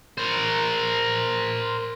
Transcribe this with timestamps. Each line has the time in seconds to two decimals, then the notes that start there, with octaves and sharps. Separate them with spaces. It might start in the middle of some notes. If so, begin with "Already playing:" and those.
0.18 A#4 C5